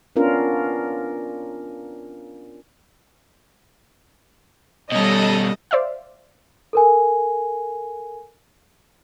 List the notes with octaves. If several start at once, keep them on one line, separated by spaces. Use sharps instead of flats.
B3 C#4 D4 F4 A#4
B2 G3 C#4 A4 D#5
C5 D5 E5 F5
A4 A#4 G#5